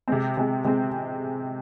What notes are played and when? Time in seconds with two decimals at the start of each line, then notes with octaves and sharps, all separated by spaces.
0.08 C3 G#3 C4
0.37 C3 G#3 C4
0.64 C3 G#3 C4